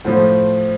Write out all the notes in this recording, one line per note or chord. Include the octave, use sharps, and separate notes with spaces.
A2 F3 C5